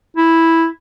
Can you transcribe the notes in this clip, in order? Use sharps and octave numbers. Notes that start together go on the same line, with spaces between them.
E4